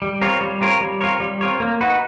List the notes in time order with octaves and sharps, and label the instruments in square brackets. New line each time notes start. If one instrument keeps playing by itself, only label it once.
[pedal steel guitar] G3
C4 F4 A#4 C#5
G3
C4 F4 A#4 C#5
G3
C4 F4 A#4 C#5
G3
C4 F4 A#4 C#5
A#3
D#4 F#4 B4